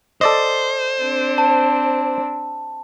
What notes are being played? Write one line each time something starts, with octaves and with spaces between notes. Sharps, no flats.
A4 C5 D5 D#5
C4 D4
A5